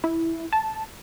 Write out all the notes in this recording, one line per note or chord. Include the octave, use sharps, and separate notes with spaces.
E4
A5